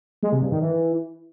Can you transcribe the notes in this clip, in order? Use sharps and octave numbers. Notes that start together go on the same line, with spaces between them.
G#3
C3
G2
D#3
E3